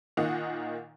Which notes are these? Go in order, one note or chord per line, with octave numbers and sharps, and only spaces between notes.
A#2 D#3 A#3 D#5 F#5